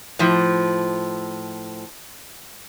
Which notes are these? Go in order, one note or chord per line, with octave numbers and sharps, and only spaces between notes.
A2 F3